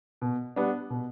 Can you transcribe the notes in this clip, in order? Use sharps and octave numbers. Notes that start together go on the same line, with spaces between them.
B2
G3 B3 D4
B2